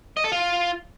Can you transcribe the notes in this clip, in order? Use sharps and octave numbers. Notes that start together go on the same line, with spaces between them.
D#5
A4
F4